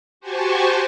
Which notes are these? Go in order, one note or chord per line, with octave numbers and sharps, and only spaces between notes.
F#4 G4 C5 G#5 A5 C#6